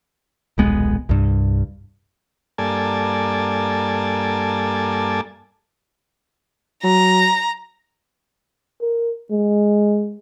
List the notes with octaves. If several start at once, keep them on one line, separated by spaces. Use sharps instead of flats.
D#1 B1 G#3 B3
C2 G2
G2 A#3 A4 D5 G#5 A5
F#3 A#5
A#4
G#3